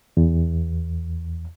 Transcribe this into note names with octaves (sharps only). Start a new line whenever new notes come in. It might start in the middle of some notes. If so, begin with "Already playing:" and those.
E2